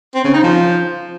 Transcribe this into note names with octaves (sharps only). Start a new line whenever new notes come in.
C4
C#3
D#4
F3